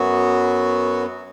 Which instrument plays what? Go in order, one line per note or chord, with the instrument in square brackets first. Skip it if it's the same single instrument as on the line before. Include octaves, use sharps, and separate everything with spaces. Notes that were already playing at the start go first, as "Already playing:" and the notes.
Already playing: [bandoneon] F#2 F#3 B3 F#4